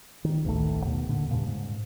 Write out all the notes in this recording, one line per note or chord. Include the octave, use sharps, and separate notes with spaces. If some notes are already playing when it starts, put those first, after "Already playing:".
D#3
A1 D2 D#3 A3
D#2 B2
A#2 D3
G2 A#2 C#3
G#2